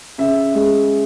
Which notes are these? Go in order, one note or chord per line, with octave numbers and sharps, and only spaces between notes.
C#3 E5
G#3